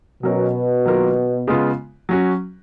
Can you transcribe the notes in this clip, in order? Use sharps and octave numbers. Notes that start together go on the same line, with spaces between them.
B2 F#3 C#4 F#4 A#4 C#5
D#3 F#3 A#3 F4 A#4
C#3 G#3 B3 F4
F#3 C#4 F#4